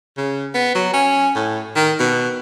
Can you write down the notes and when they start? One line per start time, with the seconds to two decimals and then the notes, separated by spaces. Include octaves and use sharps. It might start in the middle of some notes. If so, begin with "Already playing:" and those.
0.17 C#3
0.54 B3
0.75 F#3
0.94 C#4
1.36 A2
1.76 D#3
2.00 B2